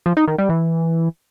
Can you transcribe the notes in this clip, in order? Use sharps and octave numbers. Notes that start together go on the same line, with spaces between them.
F3
D#4
D#3
G3
E3